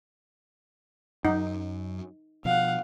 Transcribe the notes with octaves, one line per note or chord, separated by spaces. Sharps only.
F#2 F#3 D#4
B2 F3 F5 F#5